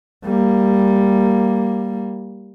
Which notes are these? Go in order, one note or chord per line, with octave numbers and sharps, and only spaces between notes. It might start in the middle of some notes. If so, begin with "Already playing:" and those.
G3 A#3